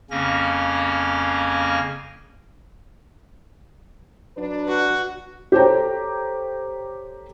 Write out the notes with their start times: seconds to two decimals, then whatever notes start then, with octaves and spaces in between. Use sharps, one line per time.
0.11 F2 C#3 A#3 C#4 A#6
4.37 F#3 D4 B4
4.68 F#4
5.52 G4 A4 C5 C#5 G5 A#5